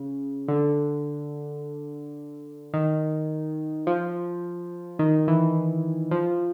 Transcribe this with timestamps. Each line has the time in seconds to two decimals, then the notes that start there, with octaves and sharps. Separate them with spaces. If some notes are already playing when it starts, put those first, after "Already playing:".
Already playing: C#3
0.48 D3
2.74 D#3
3.87 F3
4.99 D#3
5.28 E3
6.11 F3